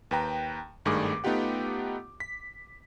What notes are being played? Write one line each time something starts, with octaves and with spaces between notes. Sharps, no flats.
D#2 B4 G5 A#5
G#1 G2 D#3 A3 G#4 D6
A3 B3 D#4 F4 G4 F#5
B6